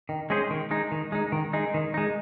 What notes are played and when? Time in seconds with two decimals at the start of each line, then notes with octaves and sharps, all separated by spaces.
0.09 D#3
0.30 G#3 C#4 G#4 C5
0.50 D#3
0.71 G#3 D#4
0.92 D#3
1.12 G#3 D#4
1.32 D#3
1.53 G#3 D#4
1.74 D#3
1.94 G#3 D#4